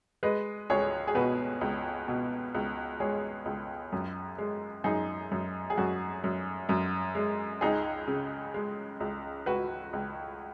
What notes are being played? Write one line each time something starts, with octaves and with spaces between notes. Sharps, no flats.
G#3 B4 D#5
C#2 G#4 C#5
G#4
B2 F#4 B4
C#2
B2
C#2
G#3 G#4 C#5
C#2
F#2
G#3
F#2 D#4 G#4
F#2
G#4
F#2 F#4
F#2
F#2
G#3
C#2 D#4 G#4
C#3
G#3
C#2
C#2 F#4 B4
C#2